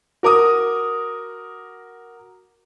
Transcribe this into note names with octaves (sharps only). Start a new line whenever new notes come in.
F#4 A#4 D6 D#6